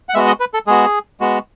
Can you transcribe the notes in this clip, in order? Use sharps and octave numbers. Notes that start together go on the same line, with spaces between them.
F#5
G#3 B3 F#4 E5
D#5
B4
A4
G#3 B3 F#4 G#4
G#3 B3 F#4